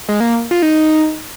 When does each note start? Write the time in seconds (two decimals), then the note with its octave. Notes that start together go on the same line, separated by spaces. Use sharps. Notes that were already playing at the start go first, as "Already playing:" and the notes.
0.09 G#3
0.20 A#3
0.51 F4
0.62 D#4